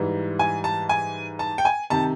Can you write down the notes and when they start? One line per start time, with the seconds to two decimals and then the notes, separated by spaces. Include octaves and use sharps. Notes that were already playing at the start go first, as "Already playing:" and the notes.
Already playing: G#2 E3 G3
0.39 G#5
0.64 A5
0.89 G#5
1.39 A5
1.58 G5
1.65 G#5
1.90 C3 D#3 A5